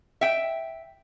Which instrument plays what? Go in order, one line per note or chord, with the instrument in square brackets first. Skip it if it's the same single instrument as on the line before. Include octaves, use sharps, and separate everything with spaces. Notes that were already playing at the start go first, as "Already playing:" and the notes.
[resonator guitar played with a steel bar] E5 G5